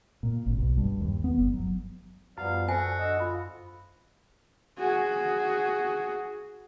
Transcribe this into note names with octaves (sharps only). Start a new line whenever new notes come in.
A#2
G#1
B1
G2
D#2
B3
G1
F#3
F#2 F3 G3 B3 F5
F#4 A4 C5 G#5
D3 D#5 E6
F4 B5
F#4 G#4